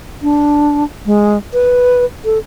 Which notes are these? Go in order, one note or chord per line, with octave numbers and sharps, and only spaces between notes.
D4
G#3
B4
A4